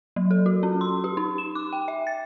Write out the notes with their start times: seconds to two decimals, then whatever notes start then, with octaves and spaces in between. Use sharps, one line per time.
0.16 F#3
0.31 A4
0.46 F#4
0.63 C#4
0.81 C6
1.04 G4
1.17 D#4
1.38 E7
1.55 D6
1.73 G5
1.88 E5
2.07 A6